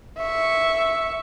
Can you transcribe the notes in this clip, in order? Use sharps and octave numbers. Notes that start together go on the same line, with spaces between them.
E5 C#6